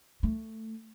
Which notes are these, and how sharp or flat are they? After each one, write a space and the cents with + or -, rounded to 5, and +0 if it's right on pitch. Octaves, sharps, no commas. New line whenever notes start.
A3 +10